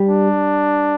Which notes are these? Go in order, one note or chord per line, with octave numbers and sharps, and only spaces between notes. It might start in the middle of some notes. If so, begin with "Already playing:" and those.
Already playing: G3
D4